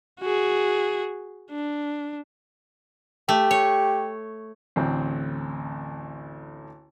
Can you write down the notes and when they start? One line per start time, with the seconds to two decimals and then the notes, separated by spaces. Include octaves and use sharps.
0.20 F#4 G#4
1.51 D4
3.29 A3 G4
3.51 C#5
4.76 A1 D2 C4